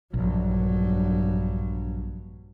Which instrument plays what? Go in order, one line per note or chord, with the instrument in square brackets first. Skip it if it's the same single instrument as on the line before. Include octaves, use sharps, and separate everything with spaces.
[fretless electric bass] A#1 [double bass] G2 F#3